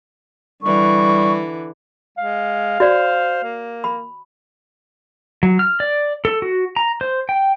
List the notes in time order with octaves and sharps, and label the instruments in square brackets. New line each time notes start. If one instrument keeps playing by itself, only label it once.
[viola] D3 E3 [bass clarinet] G3 [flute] C#6
[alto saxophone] G#3 [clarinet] F5
[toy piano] F#4 D5 [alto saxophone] C5
[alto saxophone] A#3
[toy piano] B5
[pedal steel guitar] F#3
F6
D5
A4
F#4
A#5
C5
G5